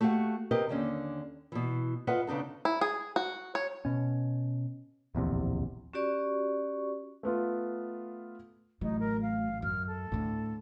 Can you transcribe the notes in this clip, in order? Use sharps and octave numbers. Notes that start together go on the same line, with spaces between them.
A3 F#4 G4 F5 F#5
C3 G4 A#4 B4 D#5
D#2 D3 C#4
B2 E3
F4 A4 B4 D#5 E5 F#5
C#3 B3 D4 D#4 A4
E4
G#4
F#4
C#5
B2 C#4
D1 A#1 E2 C3
C#4 F#4 G4 D5 C#6
A3 B3 F4
A1 A2 F#3 D#4
A#4
F5
F#2 F6
A4
D2 A2 D3